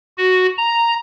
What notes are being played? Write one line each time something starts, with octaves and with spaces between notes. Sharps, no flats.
F#4
A#5